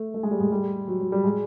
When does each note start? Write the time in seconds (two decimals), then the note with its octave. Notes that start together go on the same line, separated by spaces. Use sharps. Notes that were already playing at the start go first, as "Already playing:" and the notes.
Already playing: A3
0.14 A3
0.23 G#3
0.31 G3
0.41 G#3
0.52 G3
0.88 F#3
1.00 F#3
1.12 G3
1.24 G#3